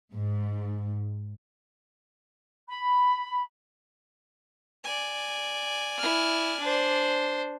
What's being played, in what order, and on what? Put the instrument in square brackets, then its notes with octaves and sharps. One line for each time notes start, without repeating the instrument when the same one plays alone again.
[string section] G#2
[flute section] B5
[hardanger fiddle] D5 G#5
[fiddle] E4 F6
D4 C5